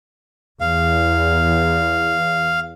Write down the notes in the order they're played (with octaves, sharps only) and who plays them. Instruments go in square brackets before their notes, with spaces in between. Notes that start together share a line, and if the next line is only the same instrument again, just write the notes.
[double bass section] E2 [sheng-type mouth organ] F5